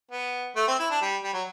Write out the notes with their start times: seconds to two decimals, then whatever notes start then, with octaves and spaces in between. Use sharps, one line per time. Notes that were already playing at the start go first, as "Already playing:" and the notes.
0.11 B3
0.56 A3
0.67 C4
0.79 E4
0.91 D4
1.02 G3
1.23 G3
1.33 F#3